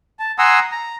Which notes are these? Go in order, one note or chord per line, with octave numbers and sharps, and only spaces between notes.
A5
F#5 G#5 A#5 C6 D#6 E6
A#5